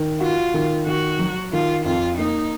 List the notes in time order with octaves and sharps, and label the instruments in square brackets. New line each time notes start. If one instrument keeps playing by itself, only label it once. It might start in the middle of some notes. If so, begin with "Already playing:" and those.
Already playing: [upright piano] D#3
[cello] F4 [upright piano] F#4
[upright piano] D#3
[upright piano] D#3 [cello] F#4
[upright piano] F#3
[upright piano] D#3 [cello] F4
[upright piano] F2 [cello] F4
[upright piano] A#3 [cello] D#4